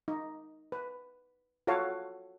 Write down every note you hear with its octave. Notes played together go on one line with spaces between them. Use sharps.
D#4
B4
F4 F#4 A4 C#5 F5